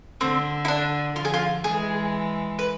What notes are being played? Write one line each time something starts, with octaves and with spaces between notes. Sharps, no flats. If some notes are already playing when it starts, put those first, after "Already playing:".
D3 C4
E4
D4
D3 F3 F4
G#4
F4
E3 G#3 G#4
B4